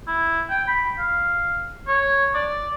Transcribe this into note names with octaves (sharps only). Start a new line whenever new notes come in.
E4
G5
B5
F5
C#5
D5